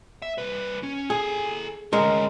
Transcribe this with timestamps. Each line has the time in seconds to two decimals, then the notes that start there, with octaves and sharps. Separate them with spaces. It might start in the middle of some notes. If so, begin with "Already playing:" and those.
0.22 E5
0.38 C2 B4
0.83 C#4
1.10 G#4 A4 G#5
1.93 D2 G#3 C#4 A#4